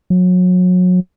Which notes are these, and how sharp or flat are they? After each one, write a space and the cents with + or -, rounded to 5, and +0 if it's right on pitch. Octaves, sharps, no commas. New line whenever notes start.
F#3 -30